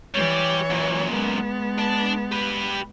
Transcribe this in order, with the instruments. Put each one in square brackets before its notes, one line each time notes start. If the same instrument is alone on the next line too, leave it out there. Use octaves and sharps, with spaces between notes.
[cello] E3 C#5 [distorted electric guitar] G3 G4
[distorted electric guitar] F#2 A#2
[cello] G#3 B3
[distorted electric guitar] D4 A5
G4 B4